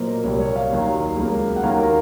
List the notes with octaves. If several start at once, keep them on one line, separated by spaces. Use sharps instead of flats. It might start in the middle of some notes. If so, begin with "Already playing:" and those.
Already playing: A#2 F#3 A#3 C5 D#5
A#4
C2 C3 F#3 A#3 C#5
C#5
F5
D#2 D#3 F#3
C#2 C#3 F#3 A#3
F#5
D#2 D#3 F#3 A#3 F5
A#4